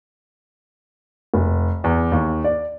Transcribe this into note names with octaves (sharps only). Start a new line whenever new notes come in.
F1
E2
D#2
D5